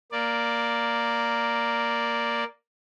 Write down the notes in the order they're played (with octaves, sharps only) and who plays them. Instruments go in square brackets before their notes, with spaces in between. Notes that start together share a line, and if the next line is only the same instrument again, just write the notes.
[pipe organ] A#3 D5